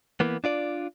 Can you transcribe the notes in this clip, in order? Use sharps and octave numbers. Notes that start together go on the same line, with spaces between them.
E3 A#3 B3
D4 F4 D5